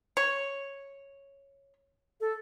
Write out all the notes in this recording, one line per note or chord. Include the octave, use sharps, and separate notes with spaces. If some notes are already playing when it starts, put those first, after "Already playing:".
C#5
A4